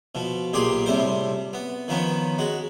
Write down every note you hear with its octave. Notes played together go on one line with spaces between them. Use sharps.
B2 F3
B1 A#2 G4 G#4 C6
A2 C3 G3 C5
B3
D#3 F3 B3 C#4
G#3 F#4